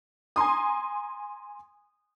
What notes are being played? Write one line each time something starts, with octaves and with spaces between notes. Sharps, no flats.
G#5 A#5 C6 D#6